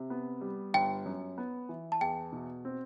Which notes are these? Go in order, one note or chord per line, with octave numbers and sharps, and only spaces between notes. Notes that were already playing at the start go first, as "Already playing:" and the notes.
Already playing: C3
B3
G3
G1 G5
F#2
B3
E3
A5
E2 G5
B2
C4